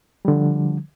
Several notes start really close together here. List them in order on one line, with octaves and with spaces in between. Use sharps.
G3 D3 F3